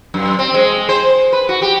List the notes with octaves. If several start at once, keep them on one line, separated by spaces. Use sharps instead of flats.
F#2
C4
G#3
C5
B4
F#4
G4